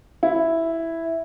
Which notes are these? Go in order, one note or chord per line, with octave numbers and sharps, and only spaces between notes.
E4